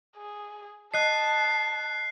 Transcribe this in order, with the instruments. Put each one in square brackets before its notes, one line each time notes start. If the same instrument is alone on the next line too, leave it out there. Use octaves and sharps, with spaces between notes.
[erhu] G#4
[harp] D#5 [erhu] A5 [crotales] F#6 C7